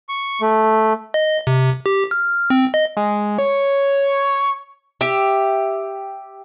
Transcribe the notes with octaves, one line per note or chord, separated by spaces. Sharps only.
C#6
A3
D#5
C3
G4
F6
C4
D#5
G#3
C#5
G4 E5